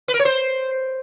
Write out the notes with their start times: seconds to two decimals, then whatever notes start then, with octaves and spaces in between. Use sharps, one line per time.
0.08 B4
0.14 A#4
0.20 C#5
0.25 C5